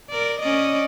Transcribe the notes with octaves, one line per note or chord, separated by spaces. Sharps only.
A#4 D5
C#4 D5 D#5